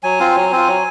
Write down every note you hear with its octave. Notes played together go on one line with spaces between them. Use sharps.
F#3 G#5
C4 F4
F#3
C4 F4
F#3